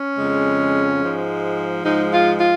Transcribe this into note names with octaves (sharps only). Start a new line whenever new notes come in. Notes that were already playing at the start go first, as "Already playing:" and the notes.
Already playing: C#4
F2 C#3 G#3
G#2 F3 G#3
G#2 F3 G#3 D#4
F4
F4